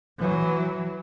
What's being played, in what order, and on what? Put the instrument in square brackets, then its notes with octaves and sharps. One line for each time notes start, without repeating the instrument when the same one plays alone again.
[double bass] E3 F#3